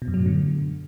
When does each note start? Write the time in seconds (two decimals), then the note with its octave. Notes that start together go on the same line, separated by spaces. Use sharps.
0.02 B2
0.08 F#2
0.14 F#3
0.20 A2
0.26 D3